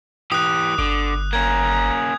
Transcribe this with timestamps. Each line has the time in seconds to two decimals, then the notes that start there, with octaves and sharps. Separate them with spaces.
0.32 E3 G4 D#6 F#6
0.78 G1 D3 D6
1.33 A#3 C#4 A#5 G#6